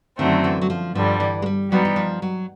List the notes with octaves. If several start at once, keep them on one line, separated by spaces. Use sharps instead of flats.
F#2 D3 D#3 F#3 A3 C4
E3
F#3
F3
G2 D3 F3 G3
E3
G#3
G3
F#3 G3 B3 D#4
E3
F3
F#3